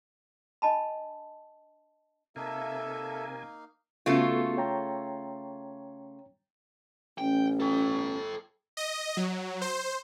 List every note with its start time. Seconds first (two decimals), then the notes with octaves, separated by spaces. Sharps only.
0.62 D4 D#5 A5 B5
2.36 C3 A#3 D#4 A4 A#4 E5 F5 G#5
4.06 C#3 A3 B3 F4 F#4 A4
4.57 C#5 G5 A#5
7.18 A1 C#4 G5
7.60 A4 G5
8.77 D#5
9.17 F#3
9.61 C5